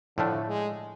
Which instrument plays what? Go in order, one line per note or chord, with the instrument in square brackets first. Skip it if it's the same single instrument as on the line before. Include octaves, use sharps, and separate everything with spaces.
[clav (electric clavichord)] A2 F3 A3 D4 [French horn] D3
[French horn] G#3